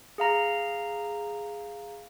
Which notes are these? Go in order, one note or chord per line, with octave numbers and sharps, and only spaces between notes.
G#4 F5 A#5